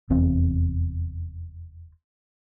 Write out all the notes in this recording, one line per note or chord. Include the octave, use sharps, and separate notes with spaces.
F1 E2 C4